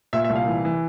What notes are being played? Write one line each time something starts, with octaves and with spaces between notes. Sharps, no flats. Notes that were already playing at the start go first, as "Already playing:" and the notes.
A#2 E5
E5
C2
F5
E3
E3